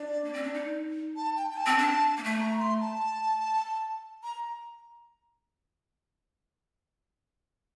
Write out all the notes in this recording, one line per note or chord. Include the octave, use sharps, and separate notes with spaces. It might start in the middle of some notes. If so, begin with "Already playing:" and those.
Already playing: D4 D5
A#3
C4
D4
D#4
A5
G5
G5
A5
C4
D4
A#3
A3
A#5
C6
A5
A#5